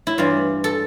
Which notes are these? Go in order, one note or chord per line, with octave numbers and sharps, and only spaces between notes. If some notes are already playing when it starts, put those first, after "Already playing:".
E4
G2 E3 G3 F4
A4